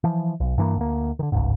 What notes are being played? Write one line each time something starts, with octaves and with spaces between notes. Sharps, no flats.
E3 F3
B1
G2 E3 A#3
D2 A#3
D3 D#3
G1 C#2 G#2